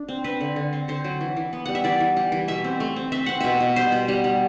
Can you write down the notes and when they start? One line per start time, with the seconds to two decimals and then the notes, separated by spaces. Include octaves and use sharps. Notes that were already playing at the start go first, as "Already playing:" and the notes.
Already playing: D4
0.09 C4
0.24 C4 B4
0.41 D3
0.56 D3
0.73 C4
0.88 D3 C5
1.04 F#3
1.21 E3
1.37 E3
1.53 B3
1.66 G3 F#5
1.75 E5
1.84 E3 D5
2.00 E3
2.17 G3
2.32 E3
2.48 B2 E5
2.64 C4
2.80 A3
2.96 C4
3.12 C4 E5
3.26 C4 F#5
3.41 B2 E5
3.60 B2
3.76 G3 C5
3.92 B2
4.08 G3
4.24 G3